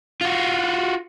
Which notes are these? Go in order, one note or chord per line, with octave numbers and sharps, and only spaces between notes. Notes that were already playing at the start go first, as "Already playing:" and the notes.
F4 F#4